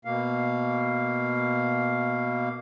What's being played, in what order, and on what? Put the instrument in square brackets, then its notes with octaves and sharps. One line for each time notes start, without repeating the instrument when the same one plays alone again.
[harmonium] B2 A#3 F5